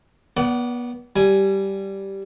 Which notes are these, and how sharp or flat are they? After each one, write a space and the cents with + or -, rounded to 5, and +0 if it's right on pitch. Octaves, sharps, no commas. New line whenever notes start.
B3 -30 D5 -30 F#5 +30
G3 -10 G#5 +0